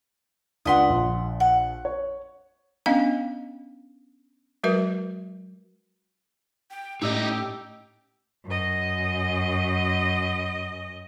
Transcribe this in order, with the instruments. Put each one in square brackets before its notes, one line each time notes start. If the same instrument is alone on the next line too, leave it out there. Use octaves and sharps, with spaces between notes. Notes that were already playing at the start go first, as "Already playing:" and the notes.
[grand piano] C#2 D4 B6 [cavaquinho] F#5 C6 D#6
[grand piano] A#1
[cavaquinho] F#5
[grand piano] C#5
[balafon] B3 C#4 D4 D#5 F5 G5
F#3 G#3 F#4 A#4 B4 E5
[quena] G5
[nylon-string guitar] A2 C#4 [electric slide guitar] D#4 E4 D#5 [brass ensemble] G4 [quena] E6
[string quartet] F#2 D#5